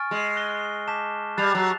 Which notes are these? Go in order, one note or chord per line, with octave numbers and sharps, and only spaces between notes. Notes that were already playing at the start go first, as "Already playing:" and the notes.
Already playing: G#5 C#6 F6 A6 D7
G#3
F#6 A#6 D#7 G7
A5 D6 G6 B6 E7
G3 F#6 A6 C7 F7
F#3